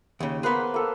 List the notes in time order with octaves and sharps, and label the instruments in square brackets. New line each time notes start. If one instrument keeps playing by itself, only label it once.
[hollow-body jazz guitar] D#2 C#3
[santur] A#3 B4 C5 [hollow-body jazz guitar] B3 G#4
[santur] A#3 A4